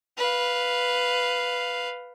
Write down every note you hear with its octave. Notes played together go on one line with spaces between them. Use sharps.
B4 F5